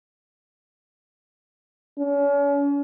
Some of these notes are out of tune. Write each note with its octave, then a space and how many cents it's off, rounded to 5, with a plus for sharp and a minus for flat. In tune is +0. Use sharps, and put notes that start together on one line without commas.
C#4 +40